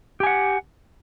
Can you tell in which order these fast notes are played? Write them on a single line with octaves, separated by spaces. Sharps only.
G4 G#5 F#5